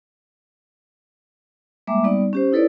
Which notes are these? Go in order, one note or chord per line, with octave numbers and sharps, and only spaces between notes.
G3 G#3 A#3 E5 D6
G3 B3 D#4 D5
C#4 G4 C5
D#4 E4 A4 B4 C#5 D5